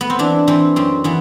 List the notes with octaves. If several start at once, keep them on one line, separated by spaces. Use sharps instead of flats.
B3
C4
E3 D4
E3 C4
F#2 C4
E3 B3